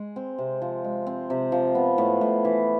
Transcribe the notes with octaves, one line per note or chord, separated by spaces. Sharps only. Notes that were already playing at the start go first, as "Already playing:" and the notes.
Already playing: G#3
C4
C3
F3
G#3
C4
C3
F3
B3
A2
A2
E3